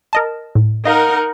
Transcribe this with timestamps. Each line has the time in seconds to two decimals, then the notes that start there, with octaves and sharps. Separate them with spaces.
0.13 A#4 D#5 A5
0.55 A2
0.85 D#4 A#4 D#5 F5 F#5